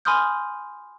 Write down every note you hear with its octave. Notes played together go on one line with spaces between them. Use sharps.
G#5 B5 C6 D#6 F6 G6